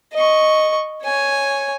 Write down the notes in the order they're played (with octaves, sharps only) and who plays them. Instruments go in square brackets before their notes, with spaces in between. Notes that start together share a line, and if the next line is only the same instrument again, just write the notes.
[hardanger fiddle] D#5 C#6
C#5 G#5